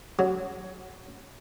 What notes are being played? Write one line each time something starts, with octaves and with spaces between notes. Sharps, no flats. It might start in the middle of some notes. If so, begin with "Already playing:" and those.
F#3